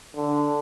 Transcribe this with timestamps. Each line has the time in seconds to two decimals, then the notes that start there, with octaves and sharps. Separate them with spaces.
0.16 D3